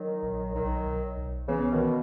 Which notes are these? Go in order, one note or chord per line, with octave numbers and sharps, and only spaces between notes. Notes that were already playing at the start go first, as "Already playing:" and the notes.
Already playing: D#3 F#3
A#1
B1 D#3 F#3
B1
B1
C#3 E3 B3
B2 D#3